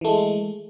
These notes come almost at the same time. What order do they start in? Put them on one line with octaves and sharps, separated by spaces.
E3 A3 G#3